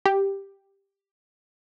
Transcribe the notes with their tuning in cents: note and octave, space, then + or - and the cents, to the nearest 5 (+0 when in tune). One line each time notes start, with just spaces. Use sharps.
G4 +5